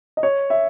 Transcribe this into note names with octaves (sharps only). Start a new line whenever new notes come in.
D#5
C#5
E5